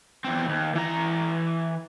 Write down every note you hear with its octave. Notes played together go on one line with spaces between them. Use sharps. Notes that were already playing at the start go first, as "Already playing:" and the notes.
E2 C4
D#2
E3 A#5